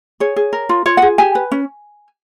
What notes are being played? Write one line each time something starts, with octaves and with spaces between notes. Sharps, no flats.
G#4 C#5
G#4
A#4
F4
F4 C#5
G#4 F#5
G4 G#5
B4
C#4